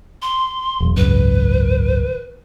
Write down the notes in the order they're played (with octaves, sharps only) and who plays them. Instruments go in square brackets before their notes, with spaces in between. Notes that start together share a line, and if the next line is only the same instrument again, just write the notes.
[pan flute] C6
[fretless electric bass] E1 B1
[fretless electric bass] G#1 C#2 F#2 [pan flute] B4